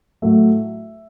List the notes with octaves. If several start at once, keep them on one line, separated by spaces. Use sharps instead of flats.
A2 F#3 A3 E5